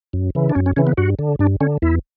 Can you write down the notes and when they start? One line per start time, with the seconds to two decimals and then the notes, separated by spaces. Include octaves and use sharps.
0.13 F#2
0.35 C#3 E3
0.50 D4
0.55 F#2 C#4
0.66 C#4
0.76 C#3 E3 C#4
0.87 B3
0.97 G2 F#4
1.19 D3
1.39 G2 D4
1.61 D3 C#4
1.82 E2 E4